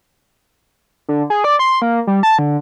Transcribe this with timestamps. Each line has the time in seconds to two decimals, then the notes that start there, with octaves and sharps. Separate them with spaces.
1.09 D3
1.30 G#4
1.44 D5
1.59 C6
1.82 A#3
2.07 G3
2.23 A5
2.39 D3